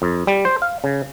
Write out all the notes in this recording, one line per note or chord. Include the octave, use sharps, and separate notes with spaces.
F2
G3
C5
F5
C#3